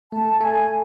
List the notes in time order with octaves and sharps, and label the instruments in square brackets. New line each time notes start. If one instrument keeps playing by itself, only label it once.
[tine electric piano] A3 [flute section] A5
[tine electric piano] A3 [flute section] G#5